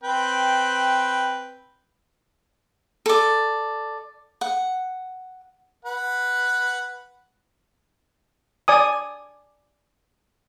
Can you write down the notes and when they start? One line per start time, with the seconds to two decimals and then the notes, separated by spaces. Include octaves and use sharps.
0.04 C4 B4 G5
3.06 A4 D5
4.41 F#5
5.85 B4 F#5
8.68 D5 G#5 D#6